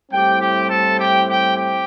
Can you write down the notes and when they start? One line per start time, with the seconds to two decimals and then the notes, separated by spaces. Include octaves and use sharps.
0.11 A2 G3 C4 E4 G4 G5
0.39 G4 G5
0.68 A4 A5
0.98 G4 G5
1.26 G4 G5
1.56 G4 G5